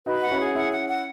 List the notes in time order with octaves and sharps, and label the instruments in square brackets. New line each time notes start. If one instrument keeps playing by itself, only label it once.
[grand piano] D#4 F#4 [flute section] B4
[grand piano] F#4 [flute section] F#5
[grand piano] C#4 E4
[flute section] G#4
[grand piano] C#4 E4 [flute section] F#5
[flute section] F#5
F#5